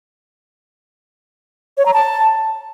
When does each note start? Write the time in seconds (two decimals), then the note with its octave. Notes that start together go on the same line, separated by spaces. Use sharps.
1.78 C#5
1.86 A#5
1.94 A5